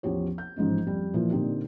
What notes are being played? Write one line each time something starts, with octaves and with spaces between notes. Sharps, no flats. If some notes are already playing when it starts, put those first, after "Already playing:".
A1 E2 F3 G4 C#5
G6
A1 G#2 F3 G#3 C#4
F2 G3
A#2 E3 F3
A#2 D3 C4 D#4 G4